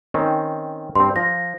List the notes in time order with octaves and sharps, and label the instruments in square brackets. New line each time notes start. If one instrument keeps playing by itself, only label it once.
[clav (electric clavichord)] D#3 C4 C#4
[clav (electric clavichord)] G2 C4 [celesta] C6
[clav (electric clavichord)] F3 [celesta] A#6